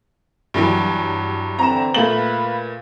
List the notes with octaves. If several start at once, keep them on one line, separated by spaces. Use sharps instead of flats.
G2 E3 F#3
D3 E3 C4 A#5 E7
A#2 A3 B4 F5 F#7